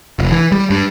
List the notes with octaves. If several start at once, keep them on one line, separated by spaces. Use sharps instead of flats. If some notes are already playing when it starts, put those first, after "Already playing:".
F1
E3
G3
G2